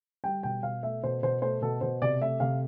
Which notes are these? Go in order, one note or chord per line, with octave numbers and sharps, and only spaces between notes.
G3 G5
B2 G5
B2 F5
A3 E5
B2 C5
B2 C5
A3 C5
B2 A4
B2 C5
C3 D5
A3 E5
C3 F5